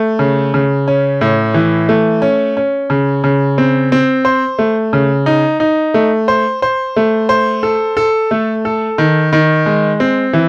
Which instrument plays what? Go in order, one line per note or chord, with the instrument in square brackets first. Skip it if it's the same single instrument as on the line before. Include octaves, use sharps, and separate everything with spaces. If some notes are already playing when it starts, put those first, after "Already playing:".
Already playing: [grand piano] A3
C#3
C#3
C#4
A2
E3
A3
C#4
C#4
C#3
C#3
C4
C4
C5
A3
C#3
D#4
D#4
A3
C5
C5
A3
C5
A4
A4
A3
A4
D#3
D#3
G#3
C4
E3